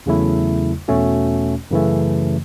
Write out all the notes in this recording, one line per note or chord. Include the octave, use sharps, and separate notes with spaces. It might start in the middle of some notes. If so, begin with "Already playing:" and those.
E2 C#3 F#3 A3 E4
E2 B2 A3 C#4 F#4
F#2 C#3 E3 A3